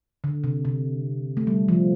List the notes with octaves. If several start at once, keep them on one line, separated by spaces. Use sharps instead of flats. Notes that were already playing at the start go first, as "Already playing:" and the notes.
D3
C3
C3
A3
G3
F3